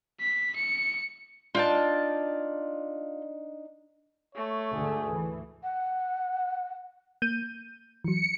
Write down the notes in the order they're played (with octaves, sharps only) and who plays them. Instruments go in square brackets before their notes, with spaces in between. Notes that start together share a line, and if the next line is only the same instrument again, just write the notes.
[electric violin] B6
C#7
[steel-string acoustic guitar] D4 D#4 [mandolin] F4 G5 A5
[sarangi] A3 [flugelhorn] C#5
[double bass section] D2 G#2 D3 [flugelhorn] G#4
[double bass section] E3
[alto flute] F#5
[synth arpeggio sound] A#3 [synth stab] G6 D#7
[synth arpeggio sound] E3 F#3 [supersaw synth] C#7